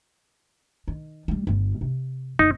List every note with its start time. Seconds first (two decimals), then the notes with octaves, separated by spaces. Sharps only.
0.88 D#3
1.28 G3 A3
1.47 G1 F4
1.81 C3
2.39 F#1 D#4